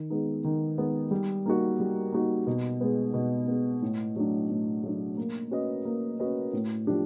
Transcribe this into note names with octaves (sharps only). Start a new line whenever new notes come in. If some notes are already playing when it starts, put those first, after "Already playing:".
Already playing: D#3
G#3 B3 D#4
D#3
G#3 B3 D#4
G3
A#3 D#4 F#4
G3
A#3 D#4 F#4
B2
G#3 B3
B2
G#3 B3
A2
F#3 A3 D4
A2
F#3 A3 D4
A#3
C#4 F#4 B4 D#5
A#3
C#4 F#4 B4 D#5
A2
F3 A3 D4 G4